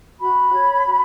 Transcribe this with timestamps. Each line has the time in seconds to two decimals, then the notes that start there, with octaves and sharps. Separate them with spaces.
0.20 F#4 B5
0.53 C#5
0.85 F#4